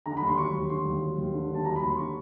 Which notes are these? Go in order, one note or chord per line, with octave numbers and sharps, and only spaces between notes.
D3 A#5
B5
D#2
C6
F#3 C#6
D#2
D3 C6
D#2
F#3
D#2
D3
D#2 A5
F#3 A#5
B5
D#2
C6
D3 C#6